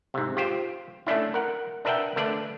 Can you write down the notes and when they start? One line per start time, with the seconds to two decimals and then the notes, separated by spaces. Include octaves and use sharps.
0.14 G#2 C3
0.37 F4 G4 C5
1.07 A3 C#4 D4 E4
1.34 A#4 F#5
1.85 D4 A#4 B4 E5 F#5 G5
2.16 D3 A3 D4 B4 D5